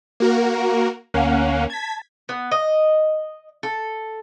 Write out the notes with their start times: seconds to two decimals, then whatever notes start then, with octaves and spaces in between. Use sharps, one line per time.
0.20 A#3 F#4 A#4
1.14 D2 A#3 C#4 F5 F#5
1.70 A5 G#6 B6
2.29 B3
2.51 D#5
3.63 A4